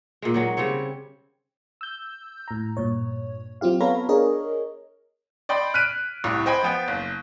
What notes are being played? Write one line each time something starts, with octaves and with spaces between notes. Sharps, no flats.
A#2 G#3
D#3 F#3 G#3
C#3 G3 C4 C#5
E6 G6
A2 A#5
G2 A#2 C#5
F#3 C4 F4 G4 F5
B3 A4 C#5 F5 A#5 B5
D4 G#4 A#4 C#5 D#5
D5 D#5 G5 B5 C6
F6 F#6 B6 D7 D#7
C2 A2
C5 D#5 G5 G#5 B5
F3 B3 G5
F#1